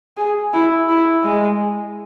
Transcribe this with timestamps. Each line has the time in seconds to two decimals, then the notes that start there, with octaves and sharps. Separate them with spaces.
0.17 G#4
0.54 E4
0.89 E4
1.24 G#3